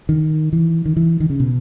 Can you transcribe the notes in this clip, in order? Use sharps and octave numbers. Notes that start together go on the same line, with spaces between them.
D#3
E3
D#3
E3
D#3
C#3
B2